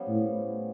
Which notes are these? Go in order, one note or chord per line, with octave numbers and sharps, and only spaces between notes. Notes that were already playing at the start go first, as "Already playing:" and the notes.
Already playing: F3 G3 B3 C#4
A2